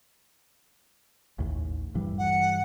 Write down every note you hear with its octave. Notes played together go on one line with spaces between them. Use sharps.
A1 D#2
G2 E3 G3
F#5